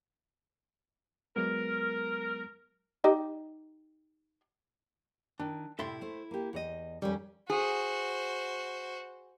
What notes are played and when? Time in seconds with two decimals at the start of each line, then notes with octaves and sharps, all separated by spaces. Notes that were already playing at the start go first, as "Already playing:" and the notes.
1.36 F#3 G#3 B3 A#4
3.04 D#4 G4 D#5
5.40 D#3 D4 E4
5.79 A2 C3 E4 A4 E5 C6
6.01 A3 C5
6.31 A#3 G4
6.53 E2 C#5 D#5
7.02 F2 D#3 G3 C#4
7.50 F#4 G#4 C5